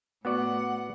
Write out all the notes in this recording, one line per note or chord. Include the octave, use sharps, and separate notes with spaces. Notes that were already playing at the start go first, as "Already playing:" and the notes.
A2 B3 F#4 D5 F#5